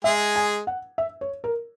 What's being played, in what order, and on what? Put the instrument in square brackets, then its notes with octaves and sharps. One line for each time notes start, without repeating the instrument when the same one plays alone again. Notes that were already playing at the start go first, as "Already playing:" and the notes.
[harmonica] G#3 G#4 [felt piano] E5
[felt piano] G#5
F#5
E5
C#5
A#4